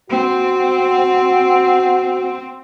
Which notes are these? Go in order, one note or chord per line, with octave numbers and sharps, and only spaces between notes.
C4 F#4